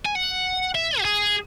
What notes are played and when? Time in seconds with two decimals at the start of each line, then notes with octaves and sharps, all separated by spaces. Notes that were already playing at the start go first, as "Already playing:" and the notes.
0.05 G#5
0.15 F#5
0.75 E5
1.00 F#4
1.05 G#4